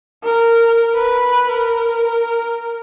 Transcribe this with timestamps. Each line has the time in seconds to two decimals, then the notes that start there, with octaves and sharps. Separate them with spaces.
0.23 A#4
0.95 B4
1.51 A#4